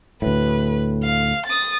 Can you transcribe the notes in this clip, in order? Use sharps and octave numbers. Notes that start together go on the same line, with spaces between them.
D2 A2 B4
F5
D#6 A6